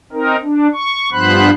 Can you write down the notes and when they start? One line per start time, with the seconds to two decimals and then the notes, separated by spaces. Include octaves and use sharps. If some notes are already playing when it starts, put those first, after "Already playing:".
0.12 C4 D#4 A#4
0.42 D4
0.74 C#6
1.12 G2 F3 B3 C5 B5 F#6